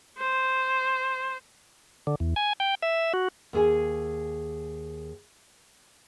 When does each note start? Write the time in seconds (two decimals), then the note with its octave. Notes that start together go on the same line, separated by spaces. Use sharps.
0.18 C5
2.07 D3
2.20 E2
2.36 G#5
2.60 G5
2.82 E5
3.14 F#4
3.53 D#2 G#4 G#5